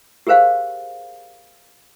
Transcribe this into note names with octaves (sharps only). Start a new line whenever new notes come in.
G4 G#4 A#4 C5 F5 G5